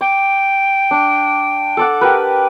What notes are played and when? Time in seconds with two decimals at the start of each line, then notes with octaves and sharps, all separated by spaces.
0.01 G5 D6
0.91 D4
1.77 A4 D5 F#5
2.01 G4 A#4 B4